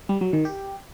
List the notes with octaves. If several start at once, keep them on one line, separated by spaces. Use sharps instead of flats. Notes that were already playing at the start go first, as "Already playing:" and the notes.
G3
F#3
D#3
G4